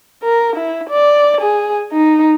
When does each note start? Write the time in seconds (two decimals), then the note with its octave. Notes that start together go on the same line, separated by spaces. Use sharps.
0.23 A#4
0.56 E4
0.90 D5
1.41 G#4
1.92 D#4